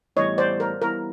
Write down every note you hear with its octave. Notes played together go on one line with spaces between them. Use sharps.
A2 E3 G3 B3 C#5 D#5
C5 D5
A#4
E3 G3 B3 E4 A#4